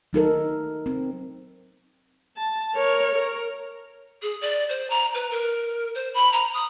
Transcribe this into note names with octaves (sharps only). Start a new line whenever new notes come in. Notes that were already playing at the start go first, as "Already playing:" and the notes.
F#3 D#4 A4 A#4
C4
A5
A#4 C#5
A#4
G#4
D5
C5
A#5
B4
A#4
C5
B5
A#5
D#6